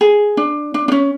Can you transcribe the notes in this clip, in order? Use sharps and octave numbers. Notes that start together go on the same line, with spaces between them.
G#4
D4
D4
D4
C#4